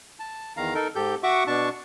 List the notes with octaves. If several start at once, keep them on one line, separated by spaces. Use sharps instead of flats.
A5
E2 D#3 F5 A#5
D#4 A4 A#4
G#2 G4 A4 G6
F#4 E5 F#5 C#6 D6
B2 D4 A5 C#6